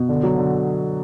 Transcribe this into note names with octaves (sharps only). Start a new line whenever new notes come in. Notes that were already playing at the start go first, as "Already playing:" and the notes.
Already playing: B2
D3
F#3
D3